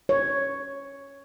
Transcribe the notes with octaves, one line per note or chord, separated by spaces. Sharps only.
C#5